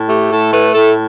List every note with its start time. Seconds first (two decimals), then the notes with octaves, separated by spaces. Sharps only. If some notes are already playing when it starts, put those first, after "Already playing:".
Already playing: A2
0.09 A3 G4
0.31 A2 A4
0.52 A3 B4
0.74 A2 A4